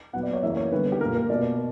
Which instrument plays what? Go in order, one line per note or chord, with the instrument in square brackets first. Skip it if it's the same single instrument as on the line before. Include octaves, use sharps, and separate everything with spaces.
[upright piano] A#2 F#3 B3 F#5
D5
C#5
C#3 E3 A#3 E5
C#5
D3 G3 B3 B4
G4
A#2 A#3 A#4
A#4
B2 A#3 D5